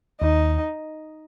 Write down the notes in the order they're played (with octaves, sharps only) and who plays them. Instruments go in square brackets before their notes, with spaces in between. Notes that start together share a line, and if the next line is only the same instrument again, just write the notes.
[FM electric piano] D#2 [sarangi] D#4